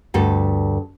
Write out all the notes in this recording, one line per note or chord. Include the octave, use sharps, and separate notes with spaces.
D2 G2 A4